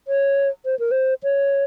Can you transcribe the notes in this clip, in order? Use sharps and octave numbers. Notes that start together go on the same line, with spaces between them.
C#5
C5
A#4
C5
C#5